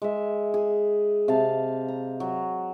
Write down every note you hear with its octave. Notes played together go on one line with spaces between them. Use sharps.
G#3 E5
G#4
C3 F5 A5
A#5
F#3